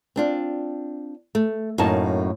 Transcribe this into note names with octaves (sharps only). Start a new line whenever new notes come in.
C4 D4 F4
A3
F#2 A2 A#3 D#4 A5